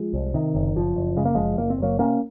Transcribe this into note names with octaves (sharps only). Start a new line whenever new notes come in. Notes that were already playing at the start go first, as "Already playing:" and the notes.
Already playing: F3 G#3
C2
C3 D#3
F#1
F#1 F3
F#1
C#3 G#3
A#3
F#1 F3 G#3
F#1 A#3
C4
F#1 F#3 A#3
C3 A#3 C#4